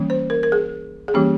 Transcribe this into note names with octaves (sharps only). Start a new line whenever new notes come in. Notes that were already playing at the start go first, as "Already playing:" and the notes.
Already playing: E3 G3 A#3 C#4
C5
A#4
A#4
G#4
G#4
E3 G3 A#3 C#4 G4